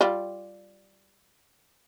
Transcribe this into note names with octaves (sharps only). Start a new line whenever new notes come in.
G3 F4